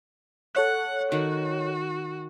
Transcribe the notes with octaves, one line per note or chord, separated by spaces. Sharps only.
A4 C#5 F#5 F#6
D#3 F#4 F#5